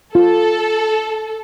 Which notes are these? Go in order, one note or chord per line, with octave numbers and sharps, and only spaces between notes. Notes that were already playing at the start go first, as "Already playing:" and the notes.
F4 A4